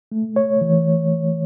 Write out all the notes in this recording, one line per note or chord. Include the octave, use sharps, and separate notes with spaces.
A3
C#5
E3